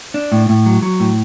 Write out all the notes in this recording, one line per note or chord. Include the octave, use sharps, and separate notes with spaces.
D4
A2
A2
F#3
F#3
A2